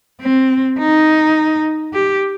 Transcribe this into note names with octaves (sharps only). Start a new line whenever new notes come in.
C4
D#4
G4